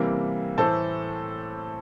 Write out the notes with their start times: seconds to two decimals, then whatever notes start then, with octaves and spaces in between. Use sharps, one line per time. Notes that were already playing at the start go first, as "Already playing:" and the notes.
Already playing: C3 E3 G3 A#3
0.58 A2 E3 A3 A4 C5